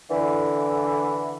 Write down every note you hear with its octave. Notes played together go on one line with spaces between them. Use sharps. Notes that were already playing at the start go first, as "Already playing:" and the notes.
D3 E3